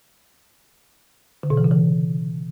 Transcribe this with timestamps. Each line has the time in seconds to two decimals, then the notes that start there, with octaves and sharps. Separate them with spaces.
1.43 D3
1.50 B2
1.57 E3
1.64 C#3
1.71 E3